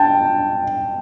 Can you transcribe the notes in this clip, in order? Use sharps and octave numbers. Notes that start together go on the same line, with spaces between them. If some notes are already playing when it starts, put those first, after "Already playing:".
Already playing: G5 A5